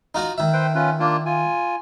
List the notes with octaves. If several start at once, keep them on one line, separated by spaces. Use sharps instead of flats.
D#4 F4 F#4
D#3 E5
B4 C5 G5
C#4 F4 B4
A#3 D4 F4
F4 G#5